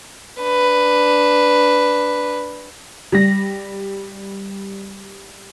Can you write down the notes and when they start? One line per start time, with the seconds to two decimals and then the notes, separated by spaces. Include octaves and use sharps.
0.43 D4 B4
3.12 G3 A#6